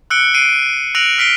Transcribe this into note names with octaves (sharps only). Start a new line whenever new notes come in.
E6 F#6 C#7 D7 G7
C7 D7 D#7
E6 F#6 A#6 D7 F7 F#7
F6 B6 C7 D7 G7